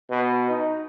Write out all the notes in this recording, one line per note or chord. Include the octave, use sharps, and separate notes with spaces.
B2
D#4